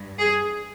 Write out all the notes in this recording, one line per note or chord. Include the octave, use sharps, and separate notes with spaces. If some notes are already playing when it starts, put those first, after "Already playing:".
Already playing: G2
G#4